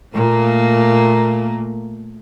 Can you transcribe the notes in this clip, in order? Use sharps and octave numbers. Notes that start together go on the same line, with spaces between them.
A#2 A3 A#3